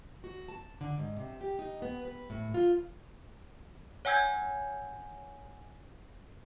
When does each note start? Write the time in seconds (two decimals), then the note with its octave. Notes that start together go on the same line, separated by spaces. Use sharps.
0.24 F#4
0.48 A5
0.81 D3
0.98 G#2
1.17 C3
1.41 G4
1.59 D#4
1.82 B3
2.05 B4
2.30 A2
2.54 F4
4.05 C#5 F#5 G#5 E6 G6 G#6